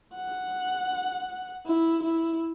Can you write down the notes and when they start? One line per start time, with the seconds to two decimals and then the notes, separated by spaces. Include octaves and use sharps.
0.15 F#5
1.66 E4
2.03 E4